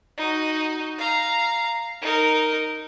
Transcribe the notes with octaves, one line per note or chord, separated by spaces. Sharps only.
D#4 F#4
F5 A#5
D#4 A#4